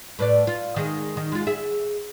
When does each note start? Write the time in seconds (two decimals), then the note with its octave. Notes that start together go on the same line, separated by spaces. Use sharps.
0.19 A2 B4 D5
0.47 F4
0.76 D#3 G#3
1.17 D#3
1.32 G#3 F4
1.47 G#4 E5